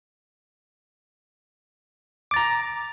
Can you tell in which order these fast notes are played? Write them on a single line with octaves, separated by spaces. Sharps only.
D6 A6 A#5